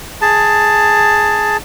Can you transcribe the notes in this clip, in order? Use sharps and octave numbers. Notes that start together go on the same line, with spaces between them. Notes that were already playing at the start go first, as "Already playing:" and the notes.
G#4 A5